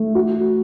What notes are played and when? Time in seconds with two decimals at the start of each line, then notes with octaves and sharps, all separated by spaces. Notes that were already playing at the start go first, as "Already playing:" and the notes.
Already playing: A3
0.15 F#4